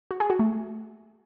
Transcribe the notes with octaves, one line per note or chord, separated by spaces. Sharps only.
F#4
G#4
F#4
A3